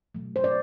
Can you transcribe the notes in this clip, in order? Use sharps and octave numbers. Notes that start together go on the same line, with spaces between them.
B2 F#3 A3
C5
D5